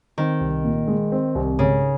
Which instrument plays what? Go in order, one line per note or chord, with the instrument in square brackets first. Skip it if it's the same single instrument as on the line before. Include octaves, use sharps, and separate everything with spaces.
[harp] D#3 [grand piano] C4
[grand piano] C2
A#2
G#3
C4
C2
[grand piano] G#2 [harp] C#3